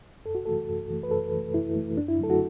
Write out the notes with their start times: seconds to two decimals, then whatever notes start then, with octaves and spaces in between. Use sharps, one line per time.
0.25 F#2 A4
0.35 F#4
0.46 E3 A3 A4
0.69 F#2
0.90 E3 A3
1.03 B4
1.11 F#2 A4
1.33 E3 A3
1.54 F#2 E4
1.76 E3 A3
1.97 F#2 D4
2.08 E4
2.19 D3 F#3 A3 A4
2.30 F#4